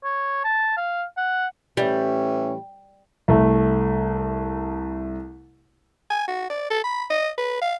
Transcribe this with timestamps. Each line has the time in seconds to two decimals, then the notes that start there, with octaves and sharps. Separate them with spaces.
0.04 C#5
0.44 A5
0.77 F5
1.17 F#5
1.77 A2 E3 G3 C#4
3.28 C2 A3
6.11 G#5
6.28 F#4
6.50 D5
6.71 A4
6.84 B5
7.10 D#5
7.38 B4
7.62 F5